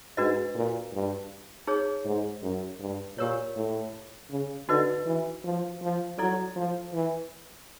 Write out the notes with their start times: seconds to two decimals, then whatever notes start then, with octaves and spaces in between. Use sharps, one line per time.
0.17 G#2 D4 F#4 B4 D#5
0.55 A#2
0.93 G2
1.67 D#4 G#4 C#5
2.05 G#2
2.42 F#2
2.80 G2
3.18 A#2 G4 A#4 C#5
3.56 A2
4.30 C#3
4.69 D3 D#4 F#4 B4 D#5
5.06 E3
5.44 F3
5.82 F3
6.18 F#3 E4 A4 D5
6.56 F3
6.93 E3